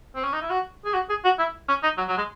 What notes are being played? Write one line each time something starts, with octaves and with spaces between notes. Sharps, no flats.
C4
C#4
D#4
E4
F#4
G#4
F#4
G#4
F#4
E4
C#4
D#4
F#3
F#3
G#3